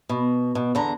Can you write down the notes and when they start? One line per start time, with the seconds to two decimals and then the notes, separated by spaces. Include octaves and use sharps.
0.09 B2
0.55 B2
0.75 E2 D3 A#5